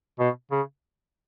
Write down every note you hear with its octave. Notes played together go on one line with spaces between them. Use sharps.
B2
C#3